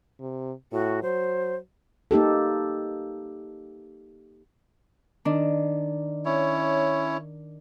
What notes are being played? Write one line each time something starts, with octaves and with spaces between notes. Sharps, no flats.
C3
A2 F#4
F#3 C5
A#3 D#4 G4 A4
D#3 D4
C#4 E4 C#5